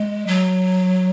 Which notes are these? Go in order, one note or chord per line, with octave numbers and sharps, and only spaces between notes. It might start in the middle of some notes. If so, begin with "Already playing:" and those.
Already playing: G#3
F#3